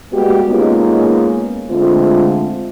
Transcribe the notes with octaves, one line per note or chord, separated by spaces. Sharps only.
G3 G#3 A#3 B3 F#4 G4
G#3 A#3 B3 C#4 D#4 F4
D3 G#3 A3 C4 F4